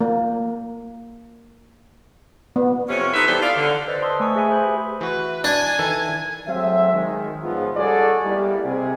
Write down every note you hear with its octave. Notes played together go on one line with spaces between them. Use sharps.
A#3
B3
F2 C3 C#4
D#4 G4 A4 B4 C5 E5
E3 G3 B3 G4 A4 C5
F4 A4 D5 F5
D3
B4 C5 D5 D#5 A6 B6
B4 C5 A5 C6 D#6 E6
A3 G#5 C#6 D#6
G#4 E5 G#5 B5
B4 C5 G#5 B5
G4 E5
E3 F#4 B4
D4 G#5 G#6
D#3 E3 A4
F#3 G#3 A3 C4 E5
D#3 G#3
G#2 C#3 F3 B3 F4
G3 C#4 F#4 G#4 A4 D5
G3 A#3 B3 D#4 E4
C3 G#4